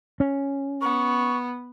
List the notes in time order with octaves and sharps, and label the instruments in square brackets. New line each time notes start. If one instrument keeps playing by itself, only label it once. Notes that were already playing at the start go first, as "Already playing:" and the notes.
[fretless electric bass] C#4
[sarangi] B3 [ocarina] C#6